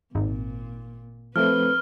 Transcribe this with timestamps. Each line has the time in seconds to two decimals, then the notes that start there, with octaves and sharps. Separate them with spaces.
0.15 G#1 A#2
1.36 F3 A3 C4 B4 F6